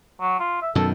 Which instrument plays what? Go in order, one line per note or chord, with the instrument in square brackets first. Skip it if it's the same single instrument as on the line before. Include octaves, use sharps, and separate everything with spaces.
[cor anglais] F#3
F4
E5
[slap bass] F#2 B2 D#3 [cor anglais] A4